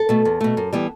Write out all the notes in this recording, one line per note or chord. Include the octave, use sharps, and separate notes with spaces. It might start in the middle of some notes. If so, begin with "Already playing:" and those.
Already playing: A4
B2 A3
E2
B2 A3
F#2
E3 G3 B3